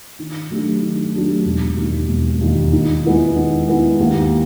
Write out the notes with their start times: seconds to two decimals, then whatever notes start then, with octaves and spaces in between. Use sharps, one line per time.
0.19 D#3
0.50 F#3 A3 D4 G4
0.82 D#3
1.14 F#3 A3 D4 G4
1.45 E1
1.77 D#2 D#3
2.08 E1
2.41 D#2 D#3
2.73 D#3
3.04 G#3 B3 E4
3.36 D#3
3.67 G#3 B3 E4
4.00 D#2